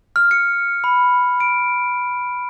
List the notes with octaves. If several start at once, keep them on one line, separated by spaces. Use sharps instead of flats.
F6
C#7
B5
D7